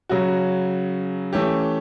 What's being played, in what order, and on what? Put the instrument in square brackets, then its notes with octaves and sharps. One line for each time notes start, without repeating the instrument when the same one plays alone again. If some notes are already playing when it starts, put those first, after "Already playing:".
[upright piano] C#3 F#3 C#4 F#4
E3 A3 C#4 G4